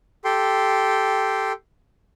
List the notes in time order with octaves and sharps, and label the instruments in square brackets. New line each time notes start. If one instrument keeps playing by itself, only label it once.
[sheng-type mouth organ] G4 A4 G5 C6